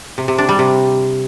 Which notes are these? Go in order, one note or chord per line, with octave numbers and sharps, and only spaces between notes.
C3
C3
D4
G3
C3